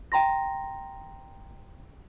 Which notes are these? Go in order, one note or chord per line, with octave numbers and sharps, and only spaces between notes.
G5 A#5 C6 A#6